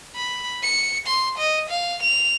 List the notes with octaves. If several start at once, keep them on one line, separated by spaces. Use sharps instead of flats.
B5
C#7
C6
D#5
F5
F7